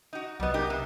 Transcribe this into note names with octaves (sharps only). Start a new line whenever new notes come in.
D#4 F#4
C2 F#3 G3 B3 D#5
D#4 G4 A#4 D#6
C3